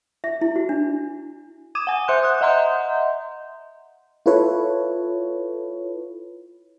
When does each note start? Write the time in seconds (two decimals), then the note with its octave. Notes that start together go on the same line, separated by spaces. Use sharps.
0.24 E5
0.41 E4
0.56 F#4
0.69 D4
1.75 D6 D#6 G#6 D#7 E7
1.87 F#5 G#5
2.08 C5 E5 C6 F#6 G6
2.23 D#6 F#6
2.41 D#5 E5 F#5 A#5 C6 G6
4.26 E4 F4 A4 B4 C#5